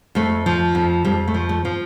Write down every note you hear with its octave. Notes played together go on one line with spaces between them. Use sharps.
F2 A3
F3
F2
F2 G3
A3
F3
A3
F3